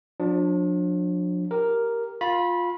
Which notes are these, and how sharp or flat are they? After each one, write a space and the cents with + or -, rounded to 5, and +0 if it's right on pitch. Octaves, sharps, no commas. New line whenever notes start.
F3 +45 D4 +5
G4 +0 A#4 +0
F4 +15 B5 -20